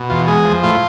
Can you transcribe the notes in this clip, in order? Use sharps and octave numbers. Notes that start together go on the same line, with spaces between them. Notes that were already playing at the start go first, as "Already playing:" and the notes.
Already playing: B2
E2 F4
G#3 G#4
F3
A2 F4